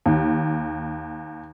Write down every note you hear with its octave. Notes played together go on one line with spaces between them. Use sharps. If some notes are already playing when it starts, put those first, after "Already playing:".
D#2